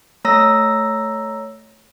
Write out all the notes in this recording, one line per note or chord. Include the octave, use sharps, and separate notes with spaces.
A3 C#5 A#5 E6 A#6